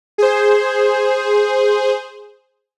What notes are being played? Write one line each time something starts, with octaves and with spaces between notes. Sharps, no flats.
G#4 C5